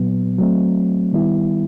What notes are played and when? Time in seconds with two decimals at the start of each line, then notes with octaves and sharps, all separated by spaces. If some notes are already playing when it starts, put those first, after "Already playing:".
Already playing: A#2 F#3 B3
0.38 F#3 A3 C4
1.13 D#3 G3 B3 E4